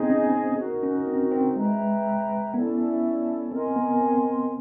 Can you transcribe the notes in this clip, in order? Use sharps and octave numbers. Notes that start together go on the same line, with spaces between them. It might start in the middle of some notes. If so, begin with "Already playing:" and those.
Already playing: B3 C4 D#4 G#4 C5 D#5
C#4
D#4 F#4 A#4
C#4
C4
C4
G#3 B4 E5 G5 A#5
B3 C#4 E4 A4 D5
C4 A#4 D#5 G#5 C6
B3
C4